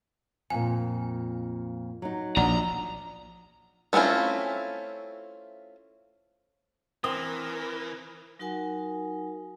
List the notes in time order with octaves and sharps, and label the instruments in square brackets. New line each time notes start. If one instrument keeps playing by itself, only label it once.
[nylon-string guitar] F2 A#2 [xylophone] G#5
[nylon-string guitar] F#3 D#4
[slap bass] A#1 [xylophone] D5 F#5 [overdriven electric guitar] A#5
[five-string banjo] A3 C4 C#4 E4 F4
[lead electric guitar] E3 [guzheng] C4 [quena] A#4 [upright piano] D#6
[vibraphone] F#3 D#4 F#4 A#4 F#5 G#5